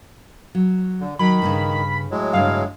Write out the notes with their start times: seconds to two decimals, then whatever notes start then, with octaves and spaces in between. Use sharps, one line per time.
0.55 F#3
1.00 D3
1.19 D#3 F#3 B5
1.42 G2 A#2 C#3
2.11 A2 F#3 G#3
2.33 G2 C#3 F5